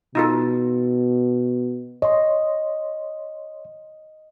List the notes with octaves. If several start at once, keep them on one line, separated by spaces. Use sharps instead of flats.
B2 D#4 F4 A4
C#5 D#5 C6